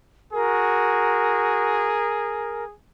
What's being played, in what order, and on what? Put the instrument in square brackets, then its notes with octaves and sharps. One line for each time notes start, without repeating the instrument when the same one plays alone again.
[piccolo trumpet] F#4 [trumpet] G#4 [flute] A#4